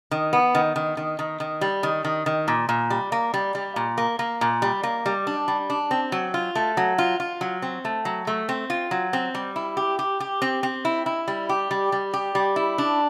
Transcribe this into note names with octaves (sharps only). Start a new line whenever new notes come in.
D#3
B3
D#3
D#3
D#3
D#3
D#3
G3
D#3
D#3
D#3
A#2
A#2
G3
A#3
G3
G3
A#2
A#3
A#3
A#2
G3
A#3
G3
D4
G3
D4
C4
F#3
F4
A3
F#3
F4
F4
F#3
C4
A3
F#3
A3
C4
F4
F#3
C4
G3
E4
G4
G4
G4
C4
C4
E4
E4
G3
G4
G3
G3
G4
G3
E4
D4